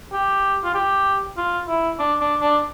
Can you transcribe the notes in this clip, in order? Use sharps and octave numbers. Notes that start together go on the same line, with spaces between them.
G4
F4
G4
F4
E4
D4
D4
D4